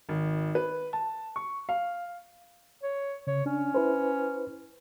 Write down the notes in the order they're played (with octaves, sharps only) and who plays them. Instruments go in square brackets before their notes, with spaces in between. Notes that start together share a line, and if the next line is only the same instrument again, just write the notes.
[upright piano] G#1
B4
A5
C#6
F5
[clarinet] C#5
[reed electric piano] C#3 [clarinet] C#5
[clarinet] C#4 [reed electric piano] D4
[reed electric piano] E4 B4 C5